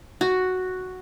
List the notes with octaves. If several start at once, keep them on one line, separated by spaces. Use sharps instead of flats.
F#4